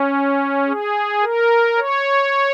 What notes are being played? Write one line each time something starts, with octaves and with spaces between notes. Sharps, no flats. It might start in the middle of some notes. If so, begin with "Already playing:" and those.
Already playing: C#4
G#4
A#4
C#5